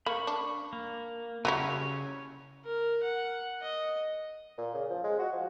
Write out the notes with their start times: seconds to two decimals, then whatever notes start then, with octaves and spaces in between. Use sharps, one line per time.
0.06 A#3 B5 C#6
0.27 D4
0.73 A#3
1.45 C#3 F#3 G3 C#4 E4 C#5
2.65 A#4
3.03 F#5
3.62 D#5
4.58 A#2
4.74 C#3
4.90 F3
5.03 G#3
5.19 F#4
5.33 F3